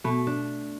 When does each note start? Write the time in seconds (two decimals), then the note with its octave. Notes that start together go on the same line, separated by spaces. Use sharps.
0.04 B2 A3
0.27 D4